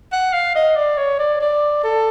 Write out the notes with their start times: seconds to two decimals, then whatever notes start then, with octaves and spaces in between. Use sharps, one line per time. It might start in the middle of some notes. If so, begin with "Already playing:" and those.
0.12 F#5
0.33 F5
0.55 D#5
0.76 D5
0.97 C#5
1.19 D5
1.41 D5
1.84 A4